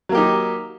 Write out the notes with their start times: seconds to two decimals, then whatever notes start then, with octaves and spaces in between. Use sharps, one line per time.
0.09 F#3
0.12 A#3
0.15 G4
0.17 D#4